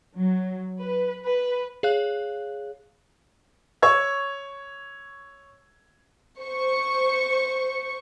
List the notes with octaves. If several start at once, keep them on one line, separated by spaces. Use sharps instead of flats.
F#3
B4
B4
G#4 C#5 F5 F#6
C#5 C#6 E6 G#6
C5 C#6